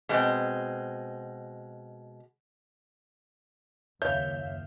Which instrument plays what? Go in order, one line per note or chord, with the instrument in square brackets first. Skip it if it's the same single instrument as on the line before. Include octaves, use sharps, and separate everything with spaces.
[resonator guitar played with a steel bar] B2 G#3 C4
[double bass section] F#1 D#2 [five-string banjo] C#5 [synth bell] E5 F5 [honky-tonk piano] G6